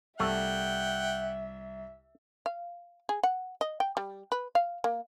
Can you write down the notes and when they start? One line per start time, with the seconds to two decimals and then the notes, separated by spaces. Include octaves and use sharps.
0.20 C2 A3 E5 F#5 G5
2.46 F5
3.09 G#4
3.23 F#5
3.61 D#5
3.80 G5
3.97 G3
4.32 B4
4.55 F5
4.84 A#3